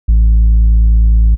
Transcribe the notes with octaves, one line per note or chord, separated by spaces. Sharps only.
A1